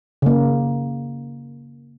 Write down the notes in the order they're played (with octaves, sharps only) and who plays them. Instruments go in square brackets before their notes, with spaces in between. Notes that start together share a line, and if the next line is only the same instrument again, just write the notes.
[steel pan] C#3 A#3